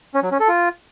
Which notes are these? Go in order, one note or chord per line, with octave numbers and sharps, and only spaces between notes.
C#4
F#3
C#4
A4
F4